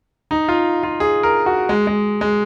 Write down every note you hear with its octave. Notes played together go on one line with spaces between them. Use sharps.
D#4
F4
F4
G#4
A#4
F#4
G#3
G#3
G#3